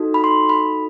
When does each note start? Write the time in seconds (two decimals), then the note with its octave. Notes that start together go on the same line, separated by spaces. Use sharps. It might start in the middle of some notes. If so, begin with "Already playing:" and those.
Already playing: D#4 F#4 A4
0.14 B5
0.24 C6
0.49 B5